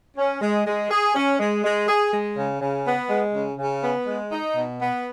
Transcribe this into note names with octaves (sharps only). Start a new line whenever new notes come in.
C#4
G#3
G#3
G#4
C#4
G#3
G#3
G#4
G#3
C#3
C#3
B3
G#3
C#3
C#3
B3
G#3
D#4
B2
B3